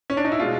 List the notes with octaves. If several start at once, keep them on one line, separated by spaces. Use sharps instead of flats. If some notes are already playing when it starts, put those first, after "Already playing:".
C#4
D4
D#4
E4
B2 G#3 F4